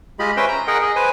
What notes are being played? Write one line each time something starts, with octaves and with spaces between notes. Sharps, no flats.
G#3 F4 G4 D#5 B5
C#4 B4 C5 E5 G5 C6
A#5
G#4 A#4 D#5 F#5 G5
G#4 D#5
B4 C5 G#5